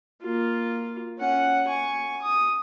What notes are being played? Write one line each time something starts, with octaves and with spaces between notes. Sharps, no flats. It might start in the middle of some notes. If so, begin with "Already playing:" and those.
A#3 F4
C#4 F#5
G#5 C#6
D#6